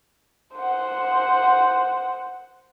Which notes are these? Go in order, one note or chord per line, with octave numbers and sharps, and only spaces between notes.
C5 F#5